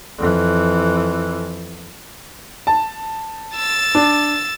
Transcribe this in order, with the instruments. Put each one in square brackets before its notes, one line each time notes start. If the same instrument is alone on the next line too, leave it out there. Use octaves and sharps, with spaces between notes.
[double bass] F2 E3
[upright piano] A5
[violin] E6 A6
[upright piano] D4